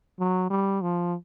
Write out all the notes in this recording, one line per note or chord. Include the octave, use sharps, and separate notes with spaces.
F#3
G3
F3